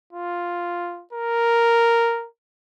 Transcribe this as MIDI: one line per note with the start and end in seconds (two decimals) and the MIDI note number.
0.13 1.03 65
1.13 2.26 70